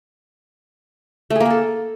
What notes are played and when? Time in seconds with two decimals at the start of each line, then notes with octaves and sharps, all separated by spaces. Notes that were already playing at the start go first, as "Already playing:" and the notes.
1.30 A3
1.35 G#4
1.40 A#3
1.45 G#4
1.50 A4